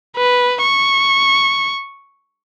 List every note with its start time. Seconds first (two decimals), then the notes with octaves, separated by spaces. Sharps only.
0.17 B4
0.62 C#6